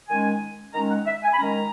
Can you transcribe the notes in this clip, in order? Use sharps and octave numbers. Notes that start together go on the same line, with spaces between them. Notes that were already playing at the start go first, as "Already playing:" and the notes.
D#3 G#3 C#4 G#5
D#3 G#3 C#4 A#5
F#5
E5
G#5
B5
D#3 G#3 C#4 A#5